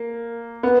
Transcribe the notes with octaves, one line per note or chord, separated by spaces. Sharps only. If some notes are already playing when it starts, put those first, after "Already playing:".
Already playing: A#3
B3